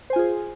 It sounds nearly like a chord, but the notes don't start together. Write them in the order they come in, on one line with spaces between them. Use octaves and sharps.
C5 G#5 F4 G#4